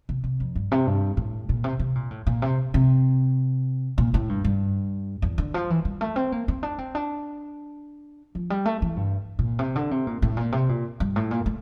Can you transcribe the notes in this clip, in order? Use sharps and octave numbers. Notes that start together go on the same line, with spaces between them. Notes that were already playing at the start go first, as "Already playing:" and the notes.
C3
C3
F2
G2
C3
G2
A2
A#2
C3
C3
A#2
A2
A#2
C3
C3
A#2
A2
G2
G2
E2
D3
F3
E3
G3
A3
C4
A#3
C4
D4
C4
D4
F3
G3
A3
E3
G2
A#2
C3
D3
C3
A#2
A2
A#2
C3
A#2
G2
A2
A#2
A3